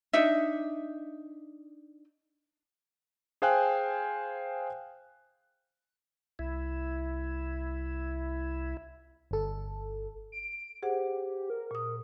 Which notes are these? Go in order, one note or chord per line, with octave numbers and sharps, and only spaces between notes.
D4 D#4 E5
G#4 C5 F5 G5 G#5 F#6
C2 E4
G1 A4
D7
G4 G#4 C5 F#5
A#4
A#2 D#6